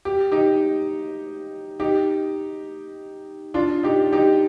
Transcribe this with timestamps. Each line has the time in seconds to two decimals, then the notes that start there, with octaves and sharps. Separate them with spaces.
0.05 G4
0.32 D#4 G4
1.80 D#4 G4
3.54 D4 F4
3.83 D#4 G4
4.12 D#4 G4